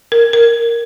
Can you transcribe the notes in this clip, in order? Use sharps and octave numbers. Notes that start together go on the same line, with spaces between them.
A#4
A#4